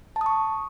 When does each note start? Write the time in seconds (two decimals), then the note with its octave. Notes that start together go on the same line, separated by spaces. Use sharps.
0.16 A5
0.21 D#6
0.26 C#6